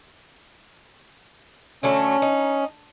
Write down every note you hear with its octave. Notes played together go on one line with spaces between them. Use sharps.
D3 F#3 A3 C#4
D#4